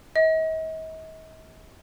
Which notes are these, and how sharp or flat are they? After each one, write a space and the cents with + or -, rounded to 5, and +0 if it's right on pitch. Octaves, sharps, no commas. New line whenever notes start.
D#5 +45